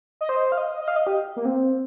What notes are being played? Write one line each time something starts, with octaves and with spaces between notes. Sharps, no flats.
D#5
C5
F5
D#5
D#5
F5
D#5
G4
A#3
C4